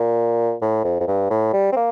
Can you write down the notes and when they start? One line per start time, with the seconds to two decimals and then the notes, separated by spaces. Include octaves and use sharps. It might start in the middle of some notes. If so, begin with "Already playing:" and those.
Already playing: A#2
0.61 A2
0.84 F2
1.00 F2
1.07 G2
1.30 A2
1.53 G3
1.72 C4
1.76 A#3